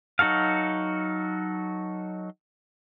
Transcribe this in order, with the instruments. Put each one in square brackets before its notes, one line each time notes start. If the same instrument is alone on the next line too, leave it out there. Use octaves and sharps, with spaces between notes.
[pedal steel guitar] F#3 D#4 F#4 A4 F5